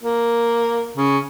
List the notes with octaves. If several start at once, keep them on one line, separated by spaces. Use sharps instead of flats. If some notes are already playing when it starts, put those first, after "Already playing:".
A#3
C#3